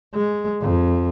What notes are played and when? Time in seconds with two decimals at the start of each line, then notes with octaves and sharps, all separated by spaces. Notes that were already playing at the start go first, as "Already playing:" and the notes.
0.15 G#3
0.61 F2